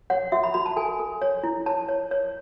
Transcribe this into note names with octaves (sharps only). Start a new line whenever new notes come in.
C#5 F#5
F#4 E5
B5
F#4 B5
A5
A4 G#5
A4
C#5
E4
C#5 A5
C#5
C#5